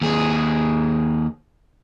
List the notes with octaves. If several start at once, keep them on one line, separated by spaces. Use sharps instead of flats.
D#2 G#4